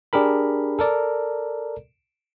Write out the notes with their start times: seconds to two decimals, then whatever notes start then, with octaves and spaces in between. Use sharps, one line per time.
0.13 D4 G4 G#4 A#4 B5
0.79 A4 A#4 D5